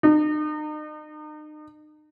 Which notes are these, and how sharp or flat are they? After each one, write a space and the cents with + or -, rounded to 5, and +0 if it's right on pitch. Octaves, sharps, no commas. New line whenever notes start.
D#4 -40